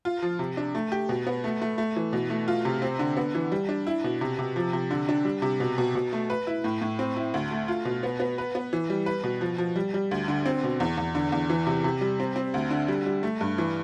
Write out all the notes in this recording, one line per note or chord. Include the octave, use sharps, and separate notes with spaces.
F4
F3
C3
D4
A3
G4
B2
B3
A3
A3
A3
E3
B2
A3
F4
C3
C4
D3
B3
E3
G3
D4
E4
B2
C3
C3
F3
C3
D3
D4
G3
C3
B2
B2
B2
A3
B4
E4
A2
A2
C4
E4
D2
A3
F4
B2
B3
B3
B4
B3
E3
G3
B4
B2
F3
F3
G3
G3
D2
D3
C4
B2
E2
E2
D3
E2
E3
C3
C3
G3
C4
C4
D2
D3
G3
G3
A3
G2
E3